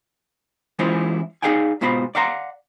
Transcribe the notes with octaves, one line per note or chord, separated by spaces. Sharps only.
E3 G#3 C#4 E4 F4 C5
D#4 G#4 D5 F5 G5 G#5
G#2 B2 F4 C5 B5
D5 F5 F#5 A#5 C6